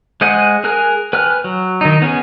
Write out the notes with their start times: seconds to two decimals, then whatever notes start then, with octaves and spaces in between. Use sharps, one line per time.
0.21 G#3 C5 D#5 F#5 G#5
0.64 G#4 A#4 G#5 F#6
1.13 B4 G5 G#5 F6 F#6
1.44 F#3
1.81 D#3 D#4
2.02 B3 C#4 G#4